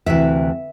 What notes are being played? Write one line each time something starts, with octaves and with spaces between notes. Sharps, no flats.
D2 C3 E3 E5